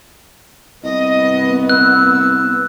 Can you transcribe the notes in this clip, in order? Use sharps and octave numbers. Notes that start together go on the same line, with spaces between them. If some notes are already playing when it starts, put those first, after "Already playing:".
C2 B3 D#5
E6 F#6